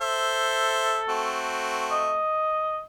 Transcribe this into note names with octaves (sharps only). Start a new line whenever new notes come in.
A4 C5 E5
A3 C4 F#4
D#5